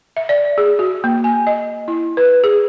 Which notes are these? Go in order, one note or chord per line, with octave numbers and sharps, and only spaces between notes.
E5
D5
G#4
F#4
A#3
G#5
D#5
E4
B4
G#4